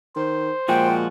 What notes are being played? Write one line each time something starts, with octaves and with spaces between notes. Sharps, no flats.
D#3 C5
A#2 F3 G#3 F#4 G5